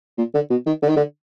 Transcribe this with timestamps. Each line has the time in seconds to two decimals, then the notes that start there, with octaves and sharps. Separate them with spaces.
0.18 A#2
0.34 D3
0.50 B2
0.67 D#3
0.82 D3
0.89 D#3
0.97 D3